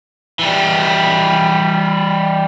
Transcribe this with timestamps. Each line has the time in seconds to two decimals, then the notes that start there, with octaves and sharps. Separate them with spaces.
0.39 E3 G3